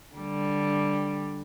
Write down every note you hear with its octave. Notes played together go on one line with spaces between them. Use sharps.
D3 G3